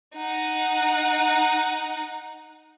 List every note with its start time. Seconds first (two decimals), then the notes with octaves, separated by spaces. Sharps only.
0.16 D#4 F#5